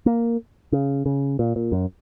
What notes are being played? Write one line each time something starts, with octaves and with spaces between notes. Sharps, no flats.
A#3
C#3
C#3
A#2
A#2
F#2